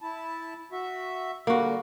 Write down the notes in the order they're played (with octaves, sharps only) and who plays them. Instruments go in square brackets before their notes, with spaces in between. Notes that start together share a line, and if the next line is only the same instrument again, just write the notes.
[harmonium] E4 A5
F#4 E5
[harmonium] D3 G3 [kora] A#3 F#4